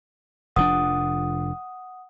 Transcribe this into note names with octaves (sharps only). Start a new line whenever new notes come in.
F1 F3 D4 F#5 D#6